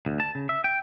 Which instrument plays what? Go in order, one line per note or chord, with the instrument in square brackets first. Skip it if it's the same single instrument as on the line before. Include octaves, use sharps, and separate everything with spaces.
[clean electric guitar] D2
A5
C#3
E5
G5